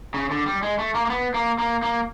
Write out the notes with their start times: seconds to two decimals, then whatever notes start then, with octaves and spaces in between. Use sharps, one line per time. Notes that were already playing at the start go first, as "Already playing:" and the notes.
0.14 C#3
0.31 D3
0.46 G3
0.63 G#3
0.79 A3
0.95 A#3
1.06 A#3
1.10 B3
1.34 A#3
1.59 A#3
1.82 A#3